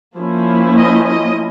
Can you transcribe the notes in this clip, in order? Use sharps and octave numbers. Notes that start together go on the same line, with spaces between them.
F3 A#3 C#4 E4
D#5
D#5